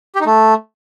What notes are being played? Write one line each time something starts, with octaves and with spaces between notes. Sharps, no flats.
G4
D#4
A3